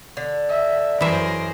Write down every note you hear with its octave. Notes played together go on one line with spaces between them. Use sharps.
D3
E5
F#2 E3 G#4 A#4 C5 E5